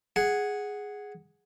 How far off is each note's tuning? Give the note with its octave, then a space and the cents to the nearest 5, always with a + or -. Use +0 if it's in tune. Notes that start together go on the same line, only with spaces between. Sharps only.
G#4 +0 F#5 +0